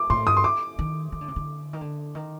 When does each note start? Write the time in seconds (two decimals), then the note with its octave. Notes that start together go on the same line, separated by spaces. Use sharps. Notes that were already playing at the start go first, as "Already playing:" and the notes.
Already playing: D6
0.10 A2 C6
0.26 G2 D#6
0.37 C6
0.44 D6
0.79 D#3
1.12 D#3
1.21 D3
1.28 C3
1.36 D3
1.73 D#3
1.81 D3
2.15 D#3